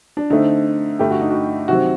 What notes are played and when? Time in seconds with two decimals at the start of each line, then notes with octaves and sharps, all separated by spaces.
0.17 D4
0.30 D3 A3 C4 D#4
0.99 G2 D3 A3 G4
1.10 F#4
1.21 D#4
1.30 F#4
1.68 C3 D#3 F#3 C4 F#4